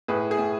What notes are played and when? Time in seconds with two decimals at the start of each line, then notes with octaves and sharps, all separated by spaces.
0.08 A2 G#4 B4
0.31 G#4
0.38 A2